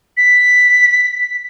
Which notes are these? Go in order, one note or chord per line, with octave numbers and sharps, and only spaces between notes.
B6